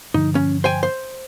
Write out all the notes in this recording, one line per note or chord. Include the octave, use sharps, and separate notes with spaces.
G2 D3 F3 D#4
C#4
C5 G5 G#5
C5